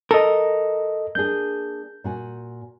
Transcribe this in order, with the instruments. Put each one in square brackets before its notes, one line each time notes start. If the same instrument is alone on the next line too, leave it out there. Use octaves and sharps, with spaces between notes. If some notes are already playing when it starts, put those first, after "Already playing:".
[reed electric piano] A4 D#5 [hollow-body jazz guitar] A#4
[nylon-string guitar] A#3 D4 G#4 [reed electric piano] G6
[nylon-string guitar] A#2 F#4 G#5